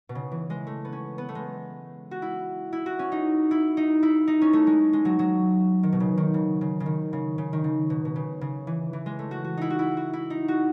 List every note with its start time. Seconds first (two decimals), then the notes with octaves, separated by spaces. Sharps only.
0.09 B2
0.15 C#3
0.31 E3
0.50 G#3
0.67 A3
0.85 B3
0.92 C#4
1.18 B3
1.29 A3
1.35 G#3
2.11 F#4
2.22 E4
2.73 E4
2.86 F#4
2.99 C#4
3.12 D#4
3.51 E4
3.77 D#4
4.03 E4
4.27 D#4
4.42 C#4
4.53 A3
4.67 G#3
4.93 G#3
5.05 F#3
5.19 F#3
5.83 D#3
5.92 B2
6.00 C#3
6.18 D#3
6.34 C#3
6.61 C#3
6.80 C#3
6.86 D#3
7.13 C#3
7.38 C#3
7.53 D#3
7.64 C#3
7.90 B2
8.05 B2
8.16 C#3
8.41 C#3
8.67 E3
8.93 E3
9.06 G#3
9.19 A3
9.31 F#4
9.44 F#4
9.57 D#4 E4
9.70 F#4
9.79 E4
9.97 F#4
10.13 E4
10.30 D#4
10.48 F#4